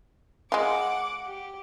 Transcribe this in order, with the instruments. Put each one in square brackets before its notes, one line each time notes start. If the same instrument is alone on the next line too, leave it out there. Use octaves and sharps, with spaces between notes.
[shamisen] G#3 F4 [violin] F#5 D6
[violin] G4